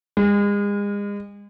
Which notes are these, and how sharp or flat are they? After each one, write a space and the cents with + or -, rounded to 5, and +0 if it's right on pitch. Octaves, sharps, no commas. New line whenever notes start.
G#3 -35